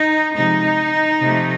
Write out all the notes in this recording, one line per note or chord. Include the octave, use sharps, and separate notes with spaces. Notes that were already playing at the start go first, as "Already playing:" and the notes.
Already playing: D#4
C3 F3 G#3 D#4
C3 F3 A3